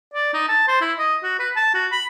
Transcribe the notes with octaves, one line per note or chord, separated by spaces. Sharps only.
D5
D#4
A5
C5
E4
D#5
F#4
B4
A5
F#4
B5